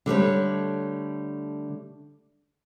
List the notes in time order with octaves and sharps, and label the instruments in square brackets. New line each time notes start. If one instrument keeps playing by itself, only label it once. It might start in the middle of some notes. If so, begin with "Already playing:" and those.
[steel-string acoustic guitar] D3 G3 A3 C#5